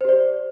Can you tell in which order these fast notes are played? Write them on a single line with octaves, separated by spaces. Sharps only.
C5 G4 D5